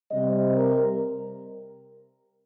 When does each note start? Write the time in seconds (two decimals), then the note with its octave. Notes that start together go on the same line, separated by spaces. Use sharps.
0.11 C3 G3 C4 D#5
0.55 A#4